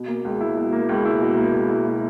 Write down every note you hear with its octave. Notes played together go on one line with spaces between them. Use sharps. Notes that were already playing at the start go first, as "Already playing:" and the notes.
Already playing: B2
A#3
C#2
E4
B2
A#3
C#2
E4
B2
A#3
C#2
E4
B2